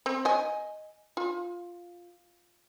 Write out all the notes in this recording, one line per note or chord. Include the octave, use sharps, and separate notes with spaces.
C4
D#5 G#5
F4